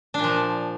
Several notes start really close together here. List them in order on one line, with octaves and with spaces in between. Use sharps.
D4 A#2 F3